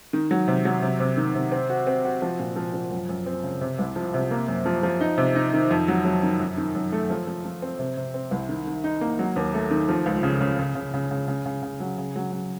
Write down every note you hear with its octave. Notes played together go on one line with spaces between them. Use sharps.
D#3
F#3
C3
F#3
C3
C3
D#3
C3
C4
F#4
C4
F#4
F3
A#2
F3
F3
F#2
F#2
C4
C#3
C3
C2
F3
C3
A#3
F#2
F3
F3
D#4
C3
D#4
D#3
F2
F#3
F#3
D#3
F#2
D#3
F#2
A3
F3
F3
F3
C4
C3
C3
C4
C2
D#3
D#3
D#4
A#3
F#3
D#2
A3
D#3
F3
C#2
C#3
C#3
C#3
C#3
C#3
C#3
C#3
C#3
C#3
F#3
C#3
F#3
F#3